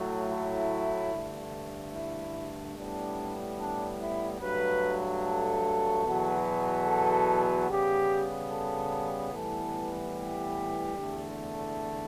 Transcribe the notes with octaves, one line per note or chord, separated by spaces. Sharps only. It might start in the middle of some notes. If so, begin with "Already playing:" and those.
Already playing: A2 F#3 A3
E4
G2 D3 A3
E4
A2 G3 B3 D4
D4
E4
G2 F#3 A3 B4
A4
E2 B2 F#3 B3
A4
C#3 G3 B3 G4
A4
A2 E3 G3 B3 A4
G4
E2 D3 A3